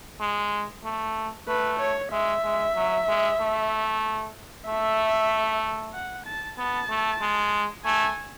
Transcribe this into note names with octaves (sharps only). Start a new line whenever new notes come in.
G#3
A3
A3 B4
C#5
G#3 E5
G#3
F#3
G#3
A3
A3 E5
F#5
A5
B3 A5
A3
G#3
A3 G#5